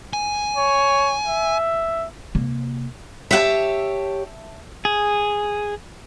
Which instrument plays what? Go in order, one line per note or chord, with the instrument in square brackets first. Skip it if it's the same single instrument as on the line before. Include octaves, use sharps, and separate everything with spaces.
[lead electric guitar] G#5
[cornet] C#5
E5
[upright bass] C3 A#3
[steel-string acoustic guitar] G4 C#5 [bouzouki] E5 F#5 A5
[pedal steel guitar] G#4